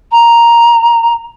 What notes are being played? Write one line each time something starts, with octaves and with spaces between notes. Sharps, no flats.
A#5